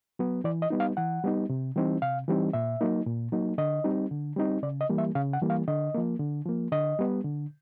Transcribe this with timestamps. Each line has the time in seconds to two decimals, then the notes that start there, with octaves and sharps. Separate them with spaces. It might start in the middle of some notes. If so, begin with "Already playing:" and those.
0.19 F#3 B3
0.44 E3 D5
0.62 D#5
0.70 G3 B3 D#4
0.80 F5
0.97 E3 F#5
1.24 G3 B3 D#4
1.49 C3
1.76 E3 G3 C4 D#4
2.02 C3 F5
2.28 E3 G3 C4 D#4
2.53 A#2 E5
2.81 F#3 A#3 D#4
3.07 A#2
3.32 F#3 A#3 D#4
3.58 D3 D#5
3.84 G3 C4 D#4
4.11 D3
4.36 G3 C4 D#4
4.63 C#3 D5
4.81 D#5
4.90 E3 G3 A#3
4.98 E5
5.15 C#3 F5
5.33 F#5
5.42 E3 G3 A#3
5.50 F5
5.68 D3 D#5
5.94 F3 A#3
6.20 D3
6.46 F3 A#3
6.72 D3 D#5
6.99 G3 B3
7.24 D3